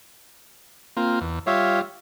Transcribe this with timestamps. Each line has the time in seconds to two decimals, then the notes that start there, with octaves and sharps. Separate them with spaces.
0.97 A#3 C4 F4
1.21 E2
1.47 G3 F4 C#5 E5 F5